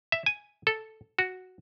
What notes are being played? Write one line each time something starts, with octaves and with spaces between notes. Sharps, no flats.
E5
G#5
A4
F#4